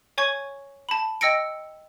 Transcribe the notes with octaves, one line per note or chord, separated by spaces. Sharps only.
C#5 G#5 C#6 G#6
A5 B5
D#5 G5 E6 A#6 C#7 D7